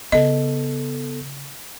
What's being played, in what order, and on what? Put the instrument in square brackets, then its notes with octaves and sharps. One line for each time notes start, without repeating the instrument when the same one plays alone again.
[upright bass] C#3 [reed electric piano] B3 A4 [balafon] D#5